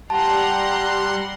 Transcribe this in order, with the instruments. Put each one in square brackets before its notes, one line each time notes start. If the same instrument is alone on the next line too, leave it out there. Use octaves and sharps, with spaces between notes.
[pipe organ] G3 F#5 C6 [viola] G4 A#5 [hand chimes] G5 A5